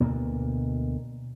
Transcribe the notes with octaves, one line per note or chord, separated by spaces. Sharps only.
D2 B2 A#3